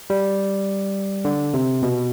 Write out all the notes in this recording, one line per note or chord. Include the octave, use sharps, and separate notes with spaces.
G3
D3
C3
B2